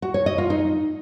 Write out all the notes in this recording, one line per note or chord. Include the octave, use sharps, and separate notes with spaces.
F#4
C#5
D#5
F4
D#4